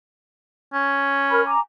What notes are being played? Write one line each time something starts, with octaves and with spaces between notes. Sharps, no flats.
C#4
A#4 B5 F6
G#5 A#5 D6